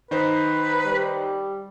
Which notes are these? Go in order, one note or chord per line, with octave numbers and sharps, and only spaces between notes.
D#3 D#4 B4 C5
G3